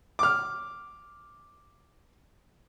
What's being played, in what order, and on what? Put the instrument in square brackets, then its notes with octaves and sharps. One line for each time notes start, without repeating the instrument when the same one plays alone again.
[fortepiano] D6 F6